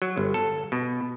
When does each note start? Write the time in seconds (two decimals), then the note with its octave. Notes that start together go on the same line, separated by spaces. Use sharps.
0.02 F#3
0.17 G1
0.34 A4
0.72 B2